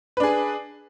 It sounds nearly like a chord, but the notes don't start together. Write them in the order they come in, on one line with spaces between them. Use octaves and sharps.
B4 D4 G#4